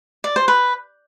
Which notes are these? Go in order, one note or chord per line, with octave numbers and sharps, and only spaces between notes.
D5
C5
B4